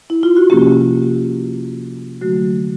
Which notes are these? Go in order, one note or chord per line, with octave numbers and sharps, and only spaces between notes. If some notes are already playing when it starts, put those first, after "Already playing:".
E4
F4
F#4
C3 F3 A#3 C#4 G4
D3 F#3 A3 F#4